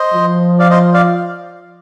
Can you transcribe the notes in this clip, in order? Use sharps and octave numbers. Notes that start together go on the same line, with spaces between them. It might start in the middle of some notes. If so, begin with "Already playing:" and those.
Already playing: C5 D#5
F3
D5 F5
C5 D#5
D5 F5